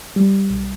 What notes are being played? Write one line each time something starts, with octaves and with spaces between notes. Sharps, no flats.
G3
B1